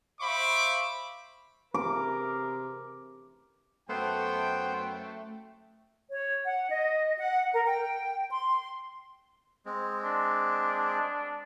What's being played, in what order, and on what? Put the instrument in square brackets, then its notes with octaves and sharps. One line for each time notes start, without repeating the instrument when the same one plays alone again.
[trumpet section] C5 E5 F5 B5 C#6 D6
[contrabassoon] C3 [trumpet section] G#4 A#4 [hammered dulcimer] D6
[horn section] F#2 G5 [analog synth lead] A3 [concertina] B3 C5
[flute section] C#5
F#5
D#5
F#5
A#4
G5
C6
[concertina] G#3 C4
[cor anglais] D4